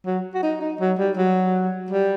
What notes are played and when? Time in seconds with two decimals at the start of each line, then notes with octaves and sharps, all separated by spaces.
0.06 F#3
0.35 F#4
0.43 D#4
0.61 D#4
0.80 F#3
0.99 G3
1.17 F#3
1.91 G3